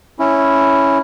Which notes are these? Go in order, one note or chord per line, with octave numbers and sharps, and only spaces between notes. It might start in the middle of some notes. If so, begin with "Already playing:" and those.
C#4 E4